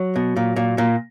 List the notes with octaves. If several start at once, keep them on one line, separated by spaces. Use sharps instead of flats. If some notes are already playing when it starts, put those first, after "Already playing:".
Already playing: F#3
B2
A#2
A#2
A#2